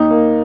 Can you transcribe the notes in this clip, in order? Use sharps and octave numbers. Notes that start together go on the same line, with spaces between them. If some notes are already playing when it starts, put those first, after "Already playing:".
Already playing: D#2 D#4
A#3